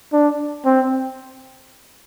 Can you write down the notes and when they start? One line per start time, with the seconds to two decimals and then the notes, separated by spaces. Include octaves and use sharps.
0.13 D4
0.65 C4